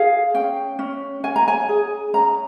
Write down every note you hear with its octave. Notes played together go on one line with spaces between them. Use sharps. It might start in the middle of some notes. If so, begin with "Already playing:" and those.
Already playing: G#4 F5
C#4 G5
C#4
C#4 G#5
A#5
G#5
G#4
C#4 A#5